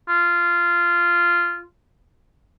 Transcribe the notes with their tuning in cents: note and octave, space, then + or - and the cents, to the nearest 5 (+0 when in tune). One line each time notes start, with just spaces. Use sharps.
F4 -15